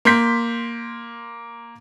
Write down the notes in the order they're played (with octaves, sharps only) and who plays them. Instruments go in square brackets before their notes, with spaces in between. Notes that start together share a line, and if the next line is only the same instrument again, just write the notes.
[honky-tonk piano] A#3 C6 G6 B6